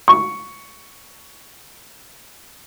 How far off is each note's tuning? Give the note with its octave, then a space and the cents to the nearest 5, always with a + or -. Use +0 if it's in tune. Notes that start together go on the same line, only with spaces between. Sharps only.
C#6 +5